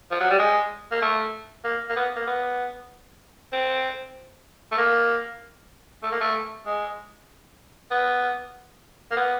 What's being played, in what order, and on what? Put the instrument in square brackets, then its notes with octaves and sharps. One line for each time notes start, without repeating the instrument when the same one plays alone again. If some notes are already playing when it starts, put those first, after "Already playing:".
[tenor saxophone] F3
F#3
G3
G#3
A#3
A3
A#3
A#3
B3
A#3
B3
C4
A3
A#3
A3
A#3
A3
G#3
B3
A#3
B3